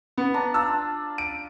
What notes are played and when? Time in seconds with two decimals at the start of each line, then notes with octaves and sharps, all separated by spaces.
0.17 B3
0.34 D4 A#5
0.54 D4 F4 A5 E6
1.18 D7